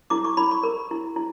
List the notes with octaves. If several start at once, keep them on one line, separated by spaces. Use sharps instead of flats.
E4 D6
C#6
E4 B5
C#6
A#4
E4
E4